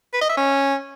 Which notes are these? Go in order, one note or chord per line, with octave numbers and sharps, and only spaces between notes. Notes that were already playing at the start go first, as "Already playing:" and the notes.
B4
D#5
E5
C#4